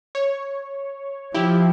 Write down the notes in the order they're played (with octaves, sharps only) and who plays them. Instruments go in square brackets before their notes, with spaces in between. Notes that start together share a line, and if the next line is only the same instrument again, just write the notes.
[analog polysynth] C#5
[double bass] F3 [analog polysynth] E4 G4